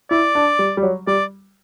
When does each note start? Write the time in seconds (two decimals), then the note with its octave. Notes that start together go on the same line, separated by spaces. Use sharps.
0.11 E4 D5
0.35 D4
0.59 G3
0.77 G3
0.83 F#3
1.07 G3 D5